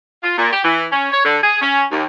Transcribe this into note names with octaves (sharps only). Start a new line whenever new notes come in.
F4
A#2
G4
E3
C#4
C#5
D3
G#4
C#4
D#2